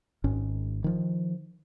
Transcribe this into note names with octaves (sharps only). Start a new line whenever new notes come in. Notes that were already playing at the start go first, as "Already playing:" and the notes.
G#1 G#2 D#3 C#4
D#3 F3